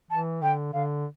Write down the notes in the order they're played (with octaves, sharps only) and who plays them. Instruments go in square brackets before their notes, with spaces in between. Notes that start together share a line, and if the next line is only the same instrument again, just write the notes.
[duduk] E3 [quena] A5
[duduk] D3 [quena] G5
[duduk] D3 [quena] F5